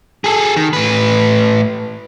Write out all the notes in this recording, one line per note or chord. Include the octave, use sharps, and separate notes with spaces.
G#4 A4
D#3
A2 B4